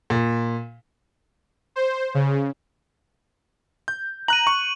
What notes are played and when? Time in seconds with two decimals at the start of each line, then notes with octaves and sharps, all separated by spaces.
0.10 A#2
1.76 C5
2.15 C#3
3.88 G6
4.28 A#5 F#6 D#7 F#7
4.47 C#6